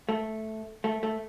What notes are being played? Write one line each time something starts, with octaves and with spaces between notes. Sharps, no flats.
A3
A3
A3